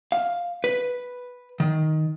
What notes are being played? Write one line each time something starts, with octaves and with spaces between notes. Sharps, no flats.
F5
B4
D#3